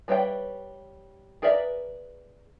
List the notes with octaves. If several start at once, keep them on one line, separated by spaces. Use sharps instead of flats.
G3 B4 C#5 E5 G5
G#4 A#4 B4 D5 E5